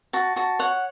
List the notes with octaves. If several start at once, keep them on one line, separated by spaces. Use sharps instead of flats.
F#4 A5
F#4 A5
C#5 F#5